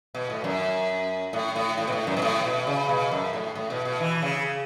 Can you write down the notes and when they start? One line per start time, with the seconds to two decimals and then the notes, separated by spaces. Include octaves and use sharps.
0.15 B2
0.30 A2
0.44 F#2
1.33 A2
1.56 A2
1.77 A2
1.87 B2
1.92 A2
2.07 F#2
2.17 B2
2.22 A2
2.44 B2
2.67 C#3
2.89 B2
3.11 F#2
3.33 A2
3.55 A2
3.70 B2
3.85 B2
4.00 E3
4.22 C#3